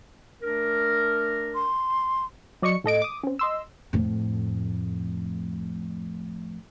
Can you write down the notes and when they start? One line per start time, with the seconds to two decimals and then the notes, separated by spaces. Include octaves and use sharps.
0.42 A3 D4 A#4
1.55 C6
2.62 F#3 D5 D#5 C#6 C#7
2.84 A2 A4 D#5 D7
3.02 D6 D#6
3.23 C4 C#4
3.39 D#5 C6 E6
3.93 F2 A2